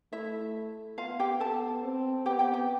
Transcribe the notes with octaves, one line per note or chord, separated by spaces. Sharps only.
A3 E4 E5
B3 F4 F5
G4 G5
B3 A4 A5
C4
B3 G4 G5
G4 G5
G4 G5